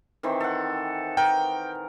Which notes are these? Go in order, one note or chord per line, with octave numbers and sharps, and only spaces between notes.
D#3 E3 C4
A4 F#5
A#4 G5